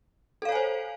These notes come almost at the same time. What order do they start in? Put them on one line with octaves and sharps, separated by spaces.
A4 F5 C#5 G#5 C5